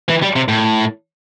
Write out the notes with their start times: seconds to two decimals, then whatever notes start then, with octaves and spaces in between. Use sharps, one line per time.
0.09 E3
0.22 G3
0.36 C3
0.48 A2